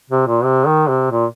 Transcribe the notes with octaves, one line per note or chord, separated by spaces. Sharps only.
C3
A#2
C3
D#3
C3
A#2